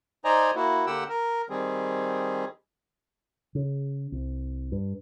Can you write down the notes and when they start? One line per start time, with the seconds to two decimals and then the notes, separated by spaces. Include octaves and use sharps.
0.25 D#4 C5 D5 D#5 G#5 A#5
0.55 A#3 E4 F#4
0.87 D3 A#3 G4 F#5 G5 E6
1.09 A#4
1.50 D#3 G3 C4 G#4
3.55 C#3
4.12 C2
4.72 G2